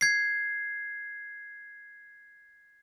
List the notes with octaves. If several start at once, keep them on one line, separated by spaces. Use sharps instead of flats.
G#6 C7